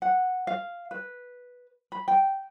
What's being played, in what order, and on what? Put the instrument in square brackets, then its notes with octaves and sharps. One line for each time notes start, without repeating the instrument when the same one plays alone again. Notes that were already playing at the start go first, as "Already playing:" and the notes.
[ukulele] F#5
F5
B4
B5
G5